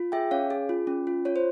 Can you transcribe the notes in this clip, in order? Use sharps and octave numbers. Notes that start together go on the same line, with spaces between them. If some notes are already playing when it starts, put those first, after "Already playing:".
Already playing: F4
G#4 E5 G5
C#4 C#5 F5
G#4
F4
C#4
F4
F4 C#5
C5